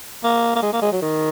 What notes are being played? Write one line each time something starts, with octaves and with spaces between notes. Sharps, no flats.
A#3
A#3
G#3
A#3
G#3
F#3
D#3